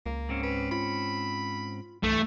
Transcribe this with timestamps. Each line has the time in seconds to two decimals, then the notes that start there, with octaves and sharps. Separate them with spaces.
0.06 C#2 A#3
0.29 G#2 C4 C#4
0.43 B4
0.71 F4 B5
2.03 C2 G2 E3 A3